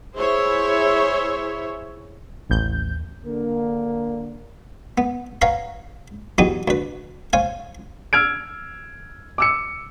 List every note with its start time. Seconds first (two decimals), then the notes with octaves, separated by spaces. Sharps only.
0.16 E4 G#4 C5 C#5 E5
2.50 A1 D#2 G6
3.26 D3 A#3
4.98 B3
5.42 B4 C#5 F5 F#5 A#5
6.38 E2 F#3 D#4 G4 D#6
6.68 D2 B4
7.33 C5 C#5 F5 G#5
8.13 E6 F6 G#6 D7
9.38 D6 E6 C#7